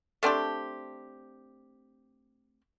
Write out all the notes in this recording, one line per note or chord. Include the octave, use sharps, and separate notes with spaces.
A3 C4 D4 G4